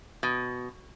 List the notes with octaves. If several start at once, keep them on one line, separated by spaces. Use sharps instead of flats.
B2